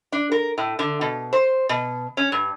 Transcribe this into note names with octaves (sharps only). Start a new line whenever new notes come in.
D4
A#4
A2
D3
B2
C5
B2
C#4
G2